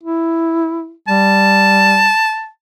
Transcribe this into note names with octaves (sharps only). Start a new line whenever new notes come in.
E4
G3 A5